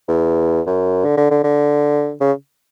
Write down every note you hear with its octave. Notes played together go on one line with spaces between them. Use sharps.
E2
F#2
D3
D3
D3
D3
C#3